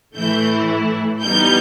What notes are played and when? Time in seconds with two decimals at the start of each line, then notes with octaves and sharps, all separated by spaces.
0.15 A2 E3 A3 E4 G6
1.22 E3 G3 B3 D#4 G6